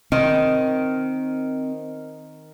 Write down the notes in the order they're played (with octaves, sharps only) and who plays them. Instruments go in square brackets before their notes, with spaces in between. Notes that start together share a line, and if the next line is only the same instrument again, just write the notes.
[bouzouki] D#3 [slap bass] C4